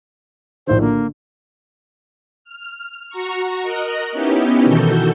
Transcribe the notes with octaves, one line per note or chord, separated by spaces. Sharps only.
A#1 A2 D#3 C5
D3 A#3
F6
F#4 A#5 C#6
A#4 D#5 F#6
B3 C#4 D#4 E4 G4
B2 D#3 E3 F#4 A4 G6